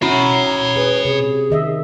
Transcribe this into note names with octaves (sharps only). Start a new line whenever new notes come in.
C#4 E4 F#4 C#5 A#5 B5
G#4 B4
C3 G#4
D#3 D#5 E5